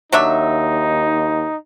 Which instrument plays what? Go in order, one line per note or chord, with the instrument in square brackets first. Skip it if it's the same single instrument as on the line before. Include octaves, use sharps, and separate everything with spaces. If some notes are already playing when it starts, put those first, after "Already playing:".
[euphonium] D#2 [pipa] F#3 D4 E5 [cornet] D#4